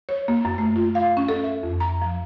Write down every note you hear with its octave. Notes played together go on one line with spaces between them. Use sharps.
C#5
A#3
F#2
A3
F4
F5
C#4
A4
E5
F2
A#5
F3